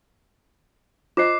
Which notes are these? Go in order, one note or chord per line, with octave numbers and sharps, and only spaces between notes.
F4 C5 D#5 D6 C7